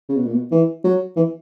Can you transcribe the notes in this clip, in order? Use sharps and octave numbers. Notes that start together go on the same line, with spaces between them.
C#3
B2
A#2
B2
E3
F#3
E3